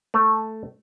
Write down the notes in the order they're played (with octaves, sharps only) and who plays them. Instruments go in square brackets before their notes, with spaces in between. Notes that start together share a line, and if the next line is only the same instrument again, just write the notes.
[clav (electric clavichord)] A3